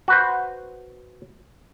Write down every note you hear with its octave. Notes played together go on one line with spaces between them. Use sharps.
F#4 B4 C5